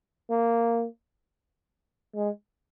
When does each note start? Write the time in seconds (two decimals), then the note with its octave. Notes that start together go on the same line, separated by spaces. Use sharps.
0.30 A#3
2.15 G#3